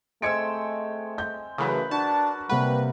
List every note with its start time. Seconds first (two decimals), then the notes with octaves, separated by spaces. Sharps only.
0.22 G#3 A3 C4 E6 G#6 C#7 D7
1.18 G6
1.58 C#3 E3 F#3 A3 A#4 B4
1.91 D4 F#4 A5
2.50 C3 G3 A#3 B4 F#5